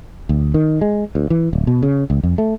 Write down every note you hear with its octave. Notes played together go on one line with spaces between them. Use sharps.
D2
D#3
G#3
D2
E3
D1
B2
C#3
C#2
F2
A3